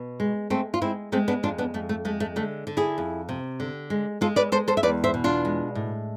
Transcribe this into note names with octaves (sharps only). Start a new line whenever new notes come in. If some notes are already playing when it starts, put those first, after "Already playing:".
Already playing: B2
G#3
G#3 A3 C4
F4
G#3 C4 E4
G#3 A3 C4
B3 D4
F2 D4 F4
B3 D4
F2 A3
A3
G#3 A3
A3
D3 A3
D3
E4 G#4
F2
C3
D3
G#3
G#3 F4 A4
B4 D5
G#3 A4 C5
A4 C5
E5
E2 B4 D5
C5 E5
B2
D4 F4
G#3
A2